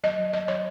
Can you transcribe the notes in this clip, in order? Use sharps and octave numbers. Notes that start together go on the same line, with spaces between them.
F#3 D#5
F#3
F#3 D#5
F#3 C#5